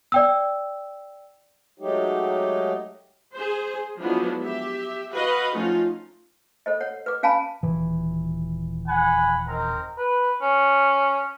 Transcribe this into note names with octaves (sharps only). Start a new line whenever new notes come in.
D5 G5 E6
F#3 G#3 A3 D#4 G4
G#4 C5
F3 F#3 G#3 B3 D4 E4
G4 E5
F#4 B4 D#5 F5 F#5
F3 A3 C#4 D#4 F4
A4 C5 D#5
C#5 F#5
B4 D6
C#4 F5 G#5 A5 B5
D#1 E3
F#5 G#5 B5
C4 D#4 A#4
B4
C#4